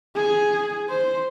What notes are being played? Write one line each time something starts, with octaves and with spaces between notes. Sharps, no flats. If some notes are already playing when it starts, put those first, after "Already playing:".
G#4
C5